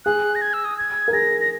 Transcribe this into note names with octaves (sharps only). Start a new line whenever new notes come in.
G#4 F#6
A#6
G#6
E6
D#6
G#6
A#4
G#4 A#6
A#6